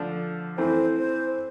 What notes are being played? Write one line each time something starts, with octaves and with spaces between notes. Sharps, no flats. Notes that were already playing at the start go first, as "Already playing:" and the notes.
Already playing: D3 F3 A3 D4 A4
E3 A3 C4 C5
C5